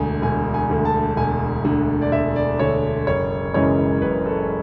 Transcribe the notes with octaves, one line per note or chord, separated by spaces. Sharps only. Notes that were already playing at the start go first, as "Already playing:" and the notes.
Already playing: E1 D2 D3 G#5
E1 G#5
G#5
D2 D3
A5
E1 G#5
D2 D3
D5
E1 E5
D5
D2 D3 C#5
F#1 C#5
F#2 C#3 E3 G#3 C#5
F#1 B4
A4